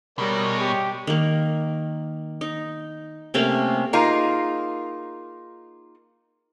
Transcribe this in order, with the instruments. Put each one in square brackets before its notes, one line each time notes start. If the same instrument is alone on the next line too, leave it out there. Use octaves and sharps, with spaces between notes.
[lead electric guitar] B2 [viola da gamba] G3 [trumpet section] G#3 C#5 [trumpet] A#4
[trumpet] G4
[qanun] D#3 A#3
D#4
C3 A3 A#3 C#4
[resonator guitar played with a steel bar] A#3 D#4 F4 G#4 A#4